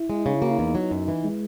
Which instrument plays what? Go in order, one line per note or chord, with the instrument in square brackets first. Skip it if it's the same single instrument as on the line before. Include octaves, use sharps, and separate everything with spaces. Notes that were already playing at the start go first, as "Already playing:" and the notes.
Already playing: [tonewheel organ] E4
[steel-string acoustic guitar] G#3
[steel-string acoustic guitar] C#3 [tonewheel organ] D#4
[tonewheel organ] E4
[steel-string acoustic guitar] A#3 [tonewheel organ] F#4
[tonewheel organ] E4
[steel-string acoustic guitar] E2 [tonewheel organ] D#4
[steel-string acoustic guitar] F#3
F#2
E3
[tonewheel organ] G#3